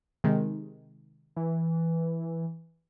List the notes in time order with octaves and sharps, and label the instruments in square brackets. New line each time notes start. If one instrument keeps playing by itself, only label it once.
[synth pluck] C3 D#3 G#3
[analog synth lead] E3